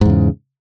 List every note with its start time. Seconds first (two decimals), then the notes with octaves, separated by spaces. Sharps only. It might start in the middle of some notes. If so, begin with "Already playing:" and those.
0.01 G#2
0.05 E2
0.10 C#3